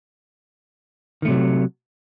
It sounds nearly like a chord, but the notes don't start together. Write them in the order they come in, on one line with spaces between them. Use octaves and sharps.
D#3 A3 C3 F#3